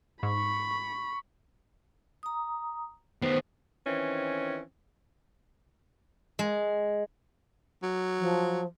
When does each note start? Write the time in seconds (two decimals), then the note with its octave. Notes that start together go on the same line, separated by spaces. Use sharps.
0.23 G#2 B5 C#6
2.23 A#5 D#6
3.22 D#3 B3 C5
3.86 D#3 E3 C4 C#4
6.39 G#3
7.82 F#3
8.20 F3